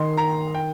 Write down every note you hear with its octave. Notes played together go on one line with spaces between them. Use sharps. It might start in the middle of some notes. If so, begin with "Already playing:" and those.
Already playing: D#3 C6
A#5
G5